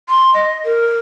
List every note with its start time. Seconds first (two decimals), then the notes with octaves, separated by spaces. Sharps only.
0.09 C6
0.34 D#5
0.65 A#4